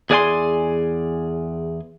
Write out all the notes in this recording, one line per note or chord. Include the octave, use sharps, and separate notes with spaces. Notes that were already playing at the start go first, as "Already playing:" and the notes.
E2 G#4 D5 F5 G#5 C6